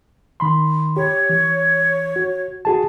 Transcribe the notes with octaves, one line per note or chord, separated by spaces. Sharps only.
D#3 B5 C6
G4 C#5
E3
F#4
F#4 G#4 A5